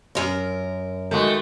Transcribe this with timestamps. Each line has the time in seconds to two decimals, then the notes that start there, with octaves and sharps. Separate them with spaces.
0.15 F#2 A#4
1.11 D#3 G#3 A3 F#4